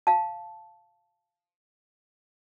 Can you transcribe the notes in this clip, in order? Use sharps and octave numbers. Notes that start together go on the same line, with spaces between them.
F5 A5